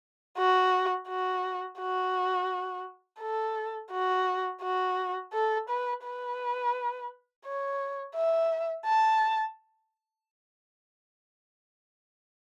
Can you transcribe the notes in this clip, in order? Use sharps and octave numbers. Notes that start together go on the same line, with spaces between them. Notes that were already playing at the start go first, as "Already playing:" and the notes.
F#4
F#4
F#4
A4
F#4
F#4
A4
B4
B4
C#5
E5
A5